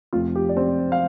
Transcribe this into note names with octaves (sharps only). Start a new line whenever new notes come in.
F1 F2 F3 C4 F4
G4
D5
C4 C5
F5